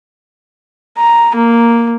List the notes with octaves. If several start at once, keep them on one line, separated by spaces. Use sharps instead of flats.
A#5
A#3